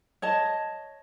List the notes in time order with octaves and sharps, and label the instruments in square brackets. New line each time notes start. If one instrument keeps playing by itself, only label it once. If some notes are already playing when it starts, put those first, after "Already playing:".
[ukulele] C#5 D#5 A5